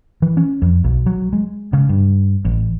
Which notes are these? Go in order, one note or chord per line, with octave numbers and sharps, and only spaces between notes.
E3
C#4
F2
B1
F#3
G#3
C#3
G2
A1